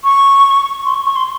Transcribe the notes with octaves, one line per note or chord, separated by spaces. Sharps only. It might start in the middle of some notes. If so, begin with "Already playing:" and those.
C#6
C6
C#6
C#6
C6